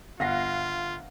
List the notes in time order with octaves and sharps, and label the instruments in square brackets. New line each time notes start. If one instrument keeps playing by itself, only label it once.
[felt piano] G1 A#6 C7 [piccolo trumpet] F4 [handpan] F5 F#5